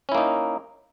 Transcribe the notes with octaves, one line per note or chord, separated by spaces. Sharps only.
A#3 C#4 D#4 E4